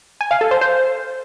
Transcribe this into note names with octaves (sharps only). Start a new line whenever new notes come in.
G#5
F5
A4
C5
C5